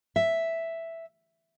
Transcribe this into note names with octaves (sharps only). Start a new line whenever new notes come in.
E5